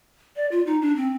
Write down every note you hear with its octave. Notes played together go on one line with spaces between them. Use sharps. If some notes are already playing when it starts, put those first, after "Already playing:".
D5
F4
D#4
D4
C4